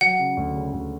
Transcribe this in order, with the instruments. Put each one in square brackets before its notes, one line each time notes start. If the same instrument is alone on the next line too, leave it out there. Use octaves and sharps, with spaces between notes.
[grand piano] F#3 [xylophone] F#5
[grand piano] C#3
D2
C#3
D2